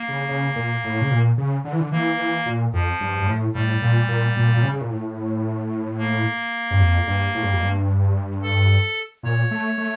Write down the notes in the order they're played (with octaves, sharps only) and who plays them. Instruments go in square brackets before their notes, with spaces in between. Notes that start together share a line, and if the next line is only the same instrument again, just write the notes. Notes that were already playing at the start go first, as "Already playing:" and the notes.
Already playing: [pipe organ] A#3
[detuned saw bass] C#3
C#3
A#2
A2
C#3
A#2
C#3
D3
E3
D3
[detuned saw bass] E3 [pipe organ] A#3
[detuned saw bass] E3
A#2
[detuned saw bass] F2 [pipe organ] F3
[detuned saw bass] G2
G2
A2
[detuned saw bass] A2 [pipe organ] G3
[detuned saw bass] A#2
A#2
A#2
A#2
C#3
C#3
A#2
A2
[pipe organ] A#3
[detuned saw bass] G2
F2
G2
A2
G2
F2
G2
[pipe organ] A4
[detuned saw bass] A#2 [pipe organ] C#5
[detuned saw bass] A3
A3